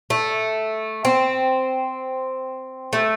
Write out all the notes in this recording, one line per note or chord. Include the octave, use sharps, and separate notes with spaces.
A3
C4
A3